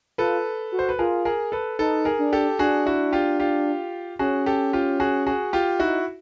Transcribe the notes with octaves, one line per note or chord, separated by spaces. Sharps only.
F4 A4 B4
F#4
C5
B4
F4 G#4 A#4
G#4 A#4
A4 B4
D#4 A4 B4
G#4 A#4
D4
G4 A4
D4 F#4 G#4
E4 F#4
F4 G4
F4 G4
C#4 F#4 G#4
G4 A4
F4 G4
F#4 G#4
F#4 G#4
F4 G4
D#4 E4 F#4